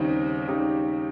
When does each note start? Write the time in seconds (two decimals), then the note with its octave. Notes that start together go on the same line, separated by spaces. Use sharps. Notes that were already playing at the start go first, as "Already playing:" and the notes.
Already playing: D#2 C#3 G3 C4 D#4
0.48 D#2 C#3 G3 D#4 G4